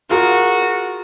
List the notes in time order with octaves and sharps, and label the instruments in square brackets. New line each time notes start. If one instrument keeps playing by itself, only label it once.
[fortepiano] F4 G#4 A#4 [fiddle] F#4